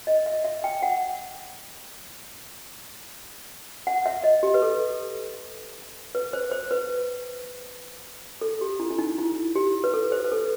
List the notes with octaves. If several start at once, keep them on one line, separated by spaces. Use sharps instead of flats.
D#5
E5
E5
G5
F#5
F#5
E5
D#5
G4
B4
A4
B4
C5
C5
B4
A4
G4
E4
E4
D#4
E4
G4
B4
A4
C5
B4
A4